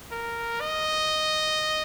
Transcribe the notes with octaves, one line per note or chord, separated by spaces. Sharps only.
A#4
D#5